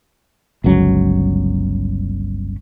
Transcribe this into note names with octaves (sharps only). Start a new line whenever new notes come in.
G1 C#2 F#3 C#4